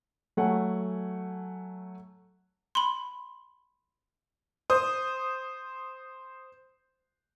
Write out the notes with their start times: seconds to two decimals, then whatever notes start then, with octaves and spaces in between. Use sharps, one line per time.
0.37 F#3 A3 F#5 G#5
2.75 B5 C6
4.70 C5 D#6